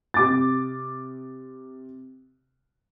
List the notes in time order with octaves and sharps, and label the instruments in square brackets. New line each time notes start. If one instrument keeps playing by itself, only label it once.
[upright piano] C3 D6 A6